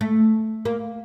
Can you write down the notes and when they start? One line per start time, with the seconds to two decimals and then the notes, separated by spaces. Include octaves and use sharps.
0.01 A3
0.65 A#3